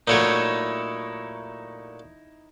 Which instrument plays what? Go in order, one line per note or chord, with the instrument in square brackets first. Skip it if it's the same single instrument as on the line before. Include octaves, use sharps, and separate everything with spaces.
[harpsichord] A#2 F#3 A3 [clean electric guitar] D#4 E4 C#5